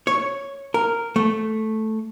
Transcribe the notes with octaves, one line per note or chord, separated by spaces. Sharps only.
C#5
A#4
A3